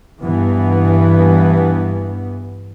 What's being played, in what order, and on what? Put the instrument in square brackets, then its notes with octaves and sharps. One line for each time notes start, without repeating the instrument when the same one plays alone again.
[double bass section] G2 E3 B3